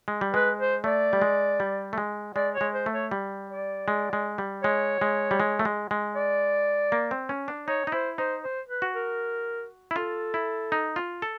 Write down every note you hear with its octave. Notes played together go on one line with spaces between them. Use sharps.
G#3
G3
G#3 B4
C5
A3 D5
G3
G#3
G3
A3
G#3
G#3 D5
C#5
G#3
C5
A3
C#5
G3
D5
G#3
G#3
G3
G#3 C#5
G#3
G3
G#3
A3
G#3
G#3
D5
A#3
C4
C#4
D4
D#4 C#5
D#4
E4 C5
D#4 C5
C5
B4
F#4
A#4
E4
F4 A4
E4
D#4
F4
A4